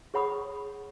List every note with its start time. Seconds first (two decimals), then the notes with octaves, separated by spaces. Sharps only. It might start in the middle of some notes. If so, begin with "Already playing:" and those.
0.14 G#4 C#5 F#5 B5 C#6 D#6